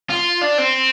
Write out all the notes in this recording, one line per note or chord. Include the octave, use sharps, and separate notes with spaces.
F4
D4
C4